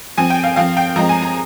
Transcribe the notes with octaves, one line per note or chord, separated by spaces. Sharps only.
F3 C4 G#5
G5
F5
F3 C4 F5
G5
F3 G#3 C4 A#5
G#5
A#5